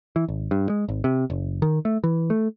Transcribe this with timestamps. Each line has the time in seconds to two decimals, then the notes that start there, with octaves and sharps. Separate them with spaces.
0.16 E3
0.28 G#1
0.51 G2
0.69 G#3
0.88 G#1
1.04 C3
1.30 F#1
1.62 D#3
1.85 A3
2.04 E3
2.30 A3